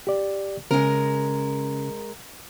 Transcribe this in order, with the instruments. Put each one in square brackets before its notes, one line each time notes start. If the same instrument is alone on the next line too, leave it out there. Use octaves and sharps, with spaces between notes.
[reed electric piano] G4 D5
[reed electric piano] C#3 C#4 [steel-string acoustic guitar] G#3 A#4